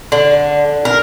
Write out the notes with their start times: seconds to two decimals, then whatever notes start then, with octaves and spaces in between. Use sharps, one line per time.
0.12 D3
0.85 A#4